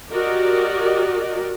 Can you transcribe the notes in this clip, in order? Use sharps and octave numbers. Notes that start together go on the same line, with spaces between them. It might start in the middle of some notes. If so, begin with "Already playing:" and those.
F#4 G4 A#4 D5 D#5